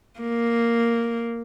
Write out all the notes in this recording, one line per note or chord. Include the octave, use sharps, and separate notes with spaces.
A#3